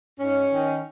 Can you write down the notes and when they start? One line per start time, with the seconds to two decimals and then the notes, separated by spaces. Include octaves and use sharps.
0.19 G#2 C#4
0.51 D#3